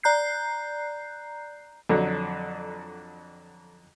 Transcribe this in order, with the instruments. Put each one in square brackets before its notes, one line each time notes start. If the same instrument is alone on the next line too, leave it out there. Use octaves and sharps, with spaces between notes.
[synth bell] D5 A#5 F#6 G6 C7
[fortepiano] F2 D3 F#3